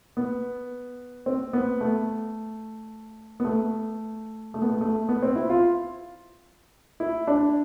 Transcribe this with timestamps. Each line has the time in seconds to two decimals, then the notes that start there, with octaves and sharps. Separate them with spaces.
0.17 B3
1.26 C4
1.53 B3
1.81 A3
3.40 B3
3.45 A3
4.54 A3
4.62 B3
4.69 A3
4.81 A3
5.09 B3
5.22 C4
5.36 E4
5.49 F4
7.00 E4
7.27 D4